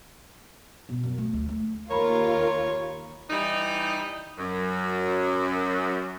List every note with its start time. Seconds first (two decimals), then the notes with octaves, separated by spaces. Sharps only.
0.89 B2
1.03 F#2
1.18 A3
1.33 D2
1.48 A3
1.90 D#2 F4 A#4 C#5 A#5 B5
3.30 E3 G3 D#4
4.38 F#2